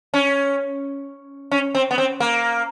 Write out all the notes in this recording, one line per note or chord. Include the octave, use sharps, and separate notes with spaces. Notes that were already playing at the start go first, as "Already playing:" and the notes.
C#4
C#4
C4
B3
C4
A#3